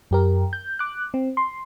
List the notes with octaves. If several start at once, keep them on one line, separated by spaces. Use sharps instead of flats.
F#2 G4 A#4
G6
D6 F#6
C4
C6